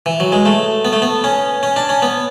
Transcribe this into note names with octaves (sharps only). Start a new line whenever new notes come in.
E3
F#3
G#3
A3
B3
A3
B3
C#4
C#4
D4
C#4
B3